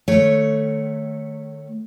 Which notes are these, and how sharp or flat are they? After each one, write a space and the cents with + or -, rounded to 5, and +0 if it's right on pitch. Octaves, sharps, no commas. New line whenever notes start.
D#3 -40 A3 +0 C#5 +0